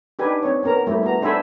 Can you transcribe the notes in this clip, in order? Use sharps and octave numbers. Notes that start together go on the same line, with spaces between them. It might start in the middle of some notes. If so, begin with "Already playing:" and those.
D4 D#4 G4 B4 G#5
C4 C#5
B3 C#4 A#4 A#5
G3 A3 E4
B3 F#4 A#5
D4 A4 C5 E5 G#5 B5